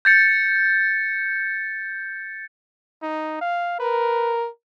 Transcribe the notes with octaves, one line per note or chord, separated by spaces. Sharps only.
G6 A6 C#7
D#4
F5
A#4 B4